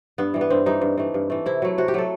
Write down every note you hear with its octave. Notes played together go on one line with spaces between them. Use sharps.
G2 B3
E3 G3
B3
G2 C4
E3 G3 D#4
G2
E3 A3
G2
E3 A3
C3 E4
F#3 A3
C3 F#4
G4
F#3 A3 A4